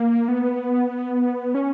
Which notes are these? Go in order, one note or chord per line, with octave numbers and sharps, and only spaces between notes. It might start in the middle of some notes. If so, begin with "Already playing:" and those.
Already playing: A#3
B3
C#4